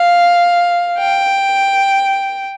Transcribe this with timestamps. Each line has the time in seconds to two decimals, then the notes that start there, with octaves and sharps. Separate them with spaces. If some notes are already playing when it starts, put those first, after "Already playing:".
Already playing: F5
0.98 G5